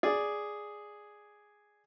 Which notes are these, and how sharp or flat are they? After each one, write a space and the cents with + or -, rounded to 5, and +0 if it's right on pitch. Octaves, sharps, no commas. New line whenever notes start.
G#4 +0 D5 +0